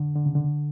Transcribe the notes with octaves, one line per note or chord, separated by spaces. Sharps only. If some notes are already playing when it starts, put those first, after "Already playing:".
Already playing: D3
D3
C#3
D3